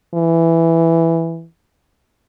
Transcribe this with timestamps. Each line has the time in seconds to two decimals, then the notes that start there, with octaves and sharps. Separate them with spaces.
0.14 E3